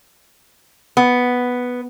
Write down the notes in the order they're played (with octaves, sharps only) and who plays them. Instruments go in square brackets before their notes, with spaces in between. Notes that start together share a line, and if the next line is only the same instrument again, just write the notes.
[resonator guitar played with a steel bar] B3